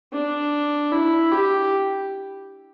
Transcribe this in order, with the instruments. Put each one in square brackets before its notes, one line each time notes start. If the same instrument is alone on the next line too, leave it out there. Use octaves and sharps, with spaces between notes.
[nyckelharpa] D4
E4
G4